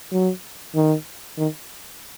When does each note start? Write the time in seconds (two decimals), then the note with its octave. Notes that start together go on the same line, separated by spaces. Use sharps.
0.12 F#3
0.75 D#3
1.38 D#3